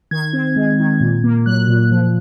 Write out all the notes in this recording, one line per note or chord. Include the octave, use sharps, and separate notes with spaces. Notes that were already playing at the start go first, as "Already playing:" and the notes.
D#3 G#6
C4
G#3
D#3
A#2
A#3
F#3 F#6
A#2
F3